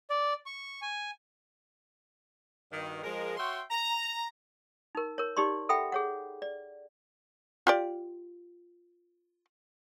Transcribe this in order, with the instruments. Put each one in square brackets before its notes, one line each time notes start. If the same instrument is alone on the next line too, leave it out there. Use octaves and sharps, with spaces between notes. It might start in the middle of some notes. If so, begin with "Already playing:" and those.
[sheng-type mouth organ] D5
C#6
G#5
[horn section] G2 B2 D#3
F3 G#3 A#4
F#4 C#5 E5 G5 C6
A#5
[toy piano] D#4 A#4
A#4 C#5
D#4 G4 D5 C6
A4 E5 F#5 G5 B5
G#4 C#5 F#5
D5
[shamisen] F4 G4 D5